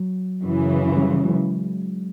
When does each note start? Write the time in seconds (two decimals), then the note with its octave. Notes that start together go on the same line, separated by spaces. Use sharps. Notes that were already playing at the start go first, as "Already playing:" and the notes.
Already playing: F#3
0.42 F#2 C#3 E3
0.97 G3
1.24 F#3 G#3